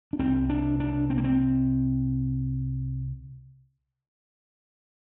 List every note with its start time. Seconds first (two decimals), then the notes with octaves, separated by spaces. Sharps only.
0.13 D4
0.19 C2 C3 C4
0.50 D4
0.80 D4
1.10 C4
1.17 A#3
1.24 C4